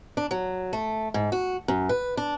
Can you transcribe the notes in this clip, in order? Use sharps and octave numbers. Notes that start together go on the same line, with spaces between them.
D4
F#3
A3
G#2
F#4
F#2
B4
D4